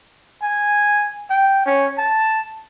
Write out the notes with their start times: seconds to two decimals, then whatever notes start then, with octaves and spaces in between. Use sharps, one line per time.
0.42 G#5
1.30 G5
1.66 C#4
1.98 A5